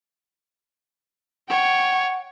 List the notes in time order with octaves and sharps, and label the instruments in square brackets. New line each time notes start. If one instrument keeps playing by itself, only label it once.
[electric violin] C#5 G5 [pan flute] F#5